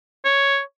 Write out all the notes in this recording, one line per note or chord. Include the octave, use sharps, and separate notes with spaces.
C#5